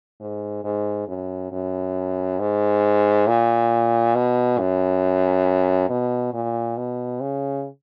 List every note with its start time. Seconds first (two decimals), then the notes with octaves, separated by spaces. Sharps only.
0.20 G#2
0.64 G#2
1.08 F#2
1.52 F#2
2.40 G#2
3.27 A#2
4.15 B2
4.59 F#2
5.89 B2
6.34 A#2
6.77 B2
7.21 C#3